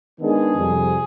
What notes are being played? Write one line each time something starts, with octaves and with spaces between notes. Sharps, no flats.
D#3 G#3 B3 D4 G#4
F2 C3 G3